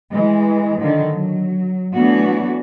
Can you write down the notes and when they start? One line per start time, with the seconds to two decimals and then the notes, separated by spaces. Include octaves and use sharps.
0.11 E3 G#3
0.79 D3 D#3 F3
1.12 F#3
1.94 E3 F#3 A3 B3 D4 F#4